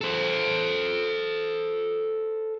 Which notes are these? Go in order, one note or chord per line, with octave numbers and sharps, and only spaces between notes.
A4 C5